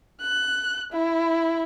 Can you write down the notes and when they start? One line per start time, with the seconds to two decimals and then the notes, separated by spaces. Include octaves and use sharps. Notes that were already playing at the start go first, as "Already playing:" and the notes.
0.21 F#6
0.92 E4